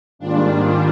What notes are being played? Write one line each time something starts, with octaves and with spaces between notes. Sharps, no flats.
G#2 D#3 G3 A#3 D4 F4